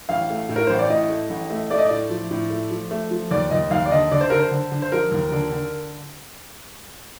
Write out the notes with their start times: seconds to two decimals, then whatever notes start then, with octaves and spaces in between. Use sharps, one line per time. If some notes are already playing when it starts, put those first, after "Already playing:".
0.09 A1 F5
0.30 A3
0.49 A2
0.56 A#4
0.67 A1 C5
0.78 D5
0.90 A2 D#5
1.09 A3
1.30 A1
1.50 A3
1.70 A3 D5
1.78 D#5
1.85 D5
1.91 A2
2.10 F3
2.31 A2
2.50 A3
2.71 F3
2.91 A3
3.11 F3
3.31 D#2 D5
3.50 D#2 D#5
3.71 D#2 F5
3.85 D5
3.91 D3 D#5
4.11 D3 D5
4.21 C5
4.30 D3 A#4
4.39 C5
4.52 D3
4.72 D3
4.82 C5
4.92 F3 A#4
5.11 D#2
5.32 D3
5.52 D3